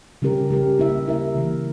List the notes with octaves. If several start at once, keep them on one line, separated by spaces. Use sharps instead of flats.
C#3 G3 C#4 G4 A#4
C#3 G3 C#4 G4 A#4
A#3 E4 A#4 E5
A#3 E4 A#4 E5
C#3 E3 A#3